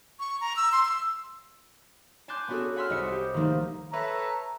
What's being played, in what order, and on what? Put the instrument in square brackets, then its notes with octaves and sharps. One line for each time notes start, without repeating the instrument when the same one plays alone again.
[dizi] C#6
A#5
E6
C6
E6
[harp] G#5 A5 C6 D6 F#6 G6
B3 C#4 D4 F#4 G#4 A4
F#5 G#5 B5 C6 E6 F6
C2 D#5 E5 C#7
G4
D#3 F3 A3 A#3 D#4
[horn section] A4 B4 C#5 E5 A#5